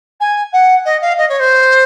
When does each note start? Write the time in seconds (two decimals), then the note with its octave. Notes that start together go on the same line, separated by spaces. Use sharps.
0.20 G#5
0.52 F#5
0.85 D#5
1.01 F5
1.18 D#5
1.29 C#5
1.39 C5